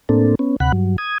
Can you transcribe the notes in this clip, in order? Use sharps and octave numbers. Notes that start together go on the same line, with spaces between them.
A2 A#3 C4 D4 A4
B3 C#4
D2 C3 F#5 B5 F#6
G2 F#3
D#6 G#6